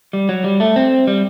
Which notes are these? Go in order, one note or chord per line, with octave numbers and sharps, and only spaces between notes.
G3
F#3
G3
A3
C4
G3